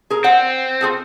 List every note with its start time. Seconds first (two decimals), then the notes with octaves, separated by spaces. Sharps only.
0.10 G#4 A#4
0.24 C4 C5 F#5
0.81 F4 G#4 A4